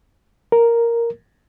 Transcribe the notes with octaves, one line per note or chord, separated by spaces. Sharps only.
A#4